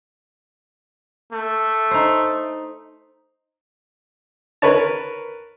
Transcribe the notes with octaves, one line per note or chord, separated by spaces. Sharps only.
A3
D#4 C5
A#4 B4 C#5 A5